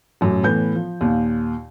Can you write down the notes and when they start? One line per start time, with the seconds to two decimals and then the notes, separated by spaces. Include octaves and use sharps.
0.21 A1 F#2
0.43 A2 E3 B3 G6
0.75 F3
1.01 D#2 A#2